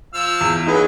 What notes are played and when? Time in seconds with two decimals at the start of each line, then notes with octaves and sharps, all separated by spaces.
0.14 F3 F5 E6
0.41 E2
0.67 F#3 D#4 G#4 B4